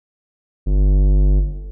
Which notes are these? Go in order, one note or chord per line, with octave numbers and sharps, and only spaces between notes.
G1